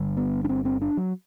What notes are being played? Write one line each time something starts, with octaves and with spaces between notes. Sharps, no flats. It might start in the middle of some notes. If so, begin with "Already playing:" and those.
Already playing: G1 G2 D3
B3
D4
C4
C4
D4
F#3